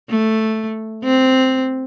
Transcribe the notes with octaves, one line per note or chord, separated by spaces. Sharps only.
A3
C4